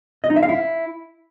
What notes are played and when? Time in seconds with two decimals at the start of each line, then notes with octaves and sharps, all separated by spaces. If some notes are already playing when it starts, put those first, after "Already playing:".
0.24 D#5
0.30 D#4
0.36 E5
0.43 F5
0.49 E4